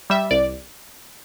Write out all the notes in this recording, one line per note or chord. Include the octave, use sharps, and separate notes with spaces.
G3 E5
C2 D5